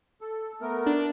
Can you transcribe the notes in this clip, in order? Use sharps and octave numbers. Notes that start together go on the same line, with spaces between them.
A4
A3 B3 A#4
D4